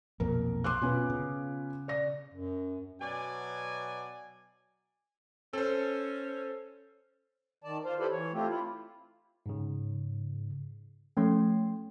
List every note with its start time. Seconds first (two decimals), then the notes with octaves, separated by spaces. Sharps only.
0.20 B1 F2 A#2 A#4
0.64 C6 D6 F#6
0.82 B2 B3 C#4 F4
1.10 C#3
1.88 D5 A#6
2.34 F#2
3.01 B2 F#3 D5 G#5
5.53 C#4 A4 C5
7.64 D#3 D5 A5
7.85 F4 C5 F5
7.99 E4 G4 A4 B4 C5 D5
8.12 E3 C#5
8.33 A3 C4 F4 G4
8.49 E4 F4
9.46 G#2 C#3
11.17 F3 A3 C#4 G5 C6